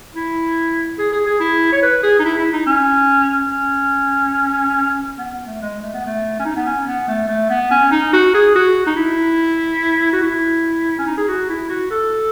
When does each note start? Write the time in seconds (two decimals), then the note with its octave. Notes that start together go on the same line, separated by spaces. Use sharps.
0.15 E4
0.98 G#4
1.12 G#4
1.26 G#4
1.40 E4
1.72 C#5
1.82 B4
2.03 G#4
2.19 D#4
2.25 E4
2.39 E4
2.53 D#4
2.66 C#4
3.51 C#4
5.18 B3
5.33 B3
5.47 A3
5.61 G#3
5.82 A3
5.94 B3
6.06 A3
6.40 C#4
6.45 D#4
6.56 B3
6.66 C#4
6.87 B3
7.08 A3
7.28 A3
7.50 B3
7.71 C#4
7.91 D#4
8.13 F#4
8.34 G#4
8.55 F#4
8.87 D#4
8.96 E4
10.13 F#4
10.22 E4
10.99 C#4
11.07 D#4
11.18 G#4
11.28 F#4
11.50 E4
11.69 F#4
11.91 A4